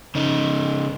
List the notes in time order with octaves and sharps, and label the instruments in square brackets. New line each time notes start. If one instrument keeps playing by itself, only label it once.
[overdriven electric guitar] C#3 D#4